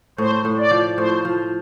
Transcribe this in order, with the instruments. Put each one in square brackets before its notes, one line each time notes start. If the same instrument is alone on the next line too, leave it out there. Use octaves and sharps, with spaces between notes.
[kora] A2 [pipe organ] C5
[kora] A2
[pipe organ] D5
[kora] F3
[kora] A2 [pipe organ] C5
[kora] F3